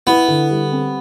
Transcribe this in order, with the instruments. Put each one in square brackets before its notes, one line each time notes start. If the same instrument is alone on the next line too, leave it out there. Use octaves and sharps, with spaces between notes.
[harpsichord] B3 [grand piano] E4
[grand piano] D3
G3
C4